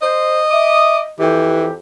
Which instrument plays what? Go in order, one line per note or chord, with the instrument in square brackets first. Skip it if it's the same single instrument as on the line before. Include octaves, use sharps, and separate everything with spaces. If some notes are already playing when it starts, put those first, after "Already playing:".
[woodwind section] C5 [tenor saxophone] D#5
[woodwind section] E5 D6 D#6
[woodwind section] F2 G4 [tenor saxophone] E3